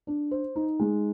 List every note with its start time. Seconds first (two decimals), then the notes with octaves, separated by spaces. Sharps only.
0.07 D4
0.31 C5
0.56 D#4
0.80 G#3